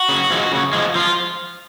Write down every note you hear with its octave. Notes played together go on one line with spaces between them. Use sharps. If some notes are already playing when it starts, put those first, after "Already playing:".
Already playing: F#4
C#3
F3 G#3
C#3
F3 G#3
F3 F4